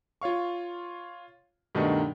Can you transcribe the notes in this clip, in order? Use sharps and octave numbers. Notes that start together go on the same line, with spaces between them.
F4 C#5 F5 C#6
G2 B2 D#3 A3 D4 D#4